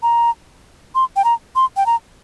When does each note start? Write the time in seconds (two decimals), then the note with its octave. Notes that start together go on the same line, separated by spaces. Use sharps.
0.03 A#5
0.95 C6
1.16 G5
1.25 A#5
1.56 C6
1.77 G5
1.86 A#5